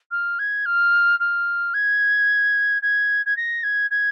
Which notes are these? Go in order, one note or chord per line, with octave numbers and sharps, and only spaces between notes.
F6
G#6
F6
F6
G#6
G#6
G#6
A#6
G#6
G#6